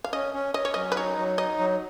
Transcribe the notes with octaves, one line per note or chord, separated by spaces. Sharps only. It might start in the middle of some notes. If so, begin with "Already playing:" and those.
F5
C#4 D#5
C#4
C#4 D#5
C#5
F#3 D#5
B4
D#4 C#5
F#3
D#4 D#5
F#3